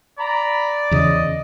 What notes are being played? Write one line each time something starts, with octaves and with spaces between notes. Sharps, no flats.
D5 A#5 B5
E2 C#3 D#5